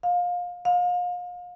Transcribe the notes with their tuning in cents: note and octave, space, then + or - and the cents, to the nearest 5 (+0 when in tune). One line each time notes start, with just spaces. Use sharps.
F5 +25
F5 +35